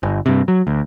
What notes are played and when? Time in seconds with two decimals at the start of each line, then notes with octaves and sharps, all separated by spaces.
0.03 G1
0.26 G2 C3
0.48 F#3
0.67 D2